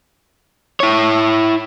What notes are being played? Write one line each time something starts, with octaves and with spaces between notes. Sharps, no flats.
E4 C#5